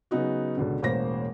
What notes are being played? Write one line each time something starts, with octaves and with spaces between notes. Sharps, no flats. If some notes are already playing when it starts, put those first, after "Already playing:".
C#3 F#3 B3 D#4 F#4
C#2 B2 D3
E1 A1 A#3 C5 A#6